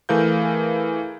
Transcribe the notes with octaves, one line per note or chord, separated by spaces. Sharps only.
E3 A3 G#4 A#4 F5 G6